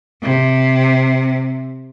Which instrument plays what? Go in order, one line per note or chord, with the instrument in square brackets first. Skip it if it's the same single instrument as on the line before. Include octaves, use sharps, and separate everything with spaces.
[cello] C3